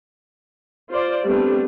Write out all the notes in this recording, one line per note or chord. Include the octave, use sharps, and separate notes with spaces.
F4 C5 D5
G3 A3 B3 C4 D4